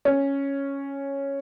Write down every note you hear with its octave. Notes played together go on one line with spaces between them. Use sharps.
C#4